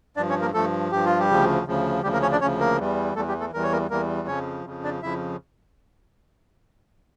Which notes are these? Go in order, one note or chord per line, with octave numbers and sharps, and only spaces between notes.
G2 F3 D4 D5
C#4 C#5
A#3 A#4
G2 F3 A3 A4
G2 F3 G4
F4
G3 G4
D2 C#3 F3
D2 C#3 F3
D2 C#3 F3 G3 G4
A#3 A#4
C#4 C#5
D4 D5
D2 C#3 F3 C#4 C#5
A#3 A#4
E2 E3 G3
E2 E3 G3 A3 A4
G3 G4
A3 A4
E2 E3 G3 A#4
C#5
A#3 A#4
E2 E3 G3 A#3 A#4
F2 C#3 F3 C#4 C#5
F2 C#3 F3
D4 D5
F2 C#3 F3 E4 E5